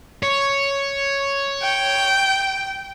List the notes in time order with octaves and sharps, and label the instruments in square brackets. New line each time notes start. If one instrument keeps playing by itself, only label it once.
[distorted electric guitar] C#5
[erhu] G5